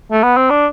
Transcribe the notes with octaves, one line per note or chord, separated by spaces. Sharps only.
A3
B3
C4
D4